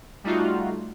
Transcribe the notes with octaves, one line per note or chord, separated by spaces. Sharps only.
G3 A3 D#4 F4 F#4